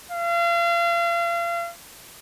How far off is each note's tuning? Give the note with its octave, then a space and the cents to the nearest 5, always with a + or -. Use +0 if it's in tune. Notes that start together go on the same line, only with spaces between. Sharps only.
F5 -35